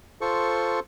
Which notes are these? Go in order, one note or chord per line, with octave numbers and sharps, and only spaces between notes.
F4 A4 C5 C#6